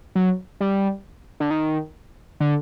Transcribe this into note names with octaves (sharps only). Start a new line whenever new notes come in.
F#3
G3
D3
D#3
D3